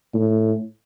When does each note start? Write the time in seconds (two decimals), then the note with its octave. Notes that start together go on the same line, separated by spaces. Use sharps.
0.14 A2